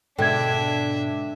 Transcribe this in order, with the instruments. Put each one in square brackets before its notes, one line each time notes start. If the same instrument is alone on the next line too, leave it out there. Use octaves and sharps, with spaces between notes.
[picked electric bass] G#2 B2 G#3 [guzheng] D3 [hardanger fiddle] D4 E5 [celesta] G5 G#6